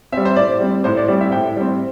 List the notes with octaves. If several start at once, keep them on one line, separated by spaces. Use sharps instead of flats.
G3 C4 E5
C5
A2 D5
G3 C4
A2 C5
D5
G3 C4 D5
E5
A2 G5
G3 C4